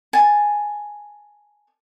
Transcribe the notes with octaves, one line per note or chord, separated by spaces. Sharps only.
G#5 A5